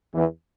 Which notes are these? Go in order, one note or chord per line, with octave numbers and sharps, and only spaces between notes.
E2 E3